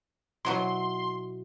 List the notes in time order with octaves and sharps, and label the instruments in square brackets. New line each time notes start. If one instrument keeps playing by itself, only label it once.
[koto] B2 F#3 E4 [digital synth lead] C6